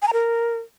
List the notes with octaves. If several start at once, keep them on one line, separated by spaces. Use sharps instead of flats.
G#5
A#5
A#4